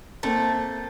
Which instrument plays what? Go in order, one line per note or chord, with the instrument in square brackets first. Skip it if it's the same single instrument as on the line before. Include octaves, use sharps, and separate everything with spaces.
[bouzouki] A3 [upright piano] A#3 C4